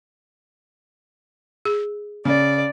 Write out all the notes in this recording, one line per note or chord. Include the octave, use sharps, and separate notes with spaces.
G#4
C#3 D5